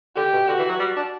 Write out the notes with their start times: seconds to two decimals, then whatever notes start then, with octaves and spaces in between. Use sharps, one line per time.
0.16 D3 G4
0.33 B2
0.48 D3 F#4
0.59 E3
0.69 F#3
0.80 G3
0.97 D4